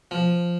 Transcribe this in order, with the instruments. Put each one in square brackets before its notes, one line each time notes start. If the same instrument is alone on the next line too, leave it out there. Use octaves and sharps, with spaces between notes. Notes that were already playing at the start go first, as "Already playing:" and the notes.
[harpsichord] F3